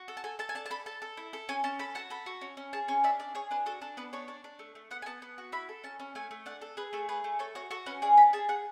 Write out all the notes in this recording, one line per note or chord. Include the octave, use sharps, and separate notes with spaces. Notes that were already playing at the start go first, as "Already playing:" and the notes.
Already playing: F#4
A4
A5
A4 G#5
A4 A5
G#5
D4 A5
A5
A4 B5
A4 A5
A4
E4
A4
C#4 G#5
C#4 A5
A4 B5
F#4 A5
A4 B5
F#4
C#4
C#4
G#4 A5
C#4 C#5
D4 E5
D4 D5
G#4 C#5
D4 B4
F#4 A4
D4 A4
B3 B4
D4 C#5
D4
D4
A3
A3
B3 F#5
G#5
B3 A5
B3
F#4
E4 B5
A4
C#4 A5
C#4
A3 G#5
A3
D4 F#5
A4
G#4 B4
A3 A4
G#4 B4
A3
A4 C#5
F#4 C#5
F#4 A4
C#4 B4
G#4 D5
D4 B5
G#4 A5
G#4 F#5